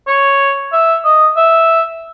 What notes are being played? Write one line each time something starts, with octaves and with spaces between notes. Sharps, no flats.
C#5
E5
D#5
E5